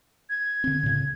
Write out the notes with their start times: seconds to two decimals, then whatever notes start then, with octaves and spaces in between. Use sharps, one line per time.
0.29 G#6
0.64 D3 C4
0.83 A2 C#3